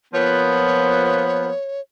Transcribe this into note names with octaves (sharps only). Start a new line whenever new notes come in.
F3 A#3 B3 C#5